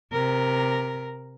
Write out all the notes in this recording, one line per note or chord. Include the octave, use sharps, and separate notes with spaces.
C3 A#4